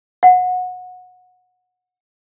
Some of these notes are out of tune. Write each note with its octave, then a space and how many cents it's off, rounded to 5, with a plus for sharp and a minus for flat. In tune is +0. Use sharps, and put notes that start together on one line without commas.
F#5 -20